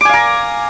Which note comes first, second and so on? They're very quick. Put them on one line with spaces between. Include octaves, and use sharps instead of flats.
D6 G#5 F5 A#5